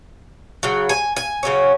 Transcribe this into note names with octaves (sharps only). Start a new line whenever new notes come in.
C#3 F#3
G#5
G#5
C#3 F#3 C#4